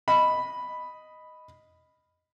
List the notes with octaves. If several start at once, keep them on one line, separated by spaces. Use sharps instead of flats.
D#5 B5